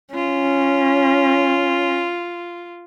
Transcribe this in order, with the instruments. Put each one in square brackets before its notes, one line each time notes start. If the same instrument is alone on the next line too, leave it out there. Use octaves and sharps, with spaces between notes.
[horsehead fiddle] C#4 [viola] F4